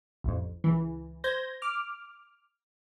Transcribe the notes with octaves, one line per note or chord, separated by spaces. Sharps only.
A1 F2
C#2 E3
C5 G6 G#6 A#6
D6 F6